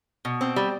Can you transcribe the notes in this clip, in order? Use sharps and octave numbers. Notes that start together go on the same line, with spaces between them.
B2
C4
G3